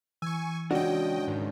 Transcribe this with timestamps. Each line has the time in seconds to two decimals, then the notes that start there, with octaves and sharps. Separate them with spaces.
0.22 E3 G#5 C#6 E6
0.71 C#2 C#4 D4 F#4 D5 D#5 G5
1.27 G#2 D#3